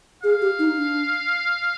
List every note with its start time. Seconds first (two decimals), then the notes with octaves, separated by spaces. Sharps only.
0.23 G#4 F5
0.42 G4
0.59 D#4
0.76 D4